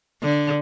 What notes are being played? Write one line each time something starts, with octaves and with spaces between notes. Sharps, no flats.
D3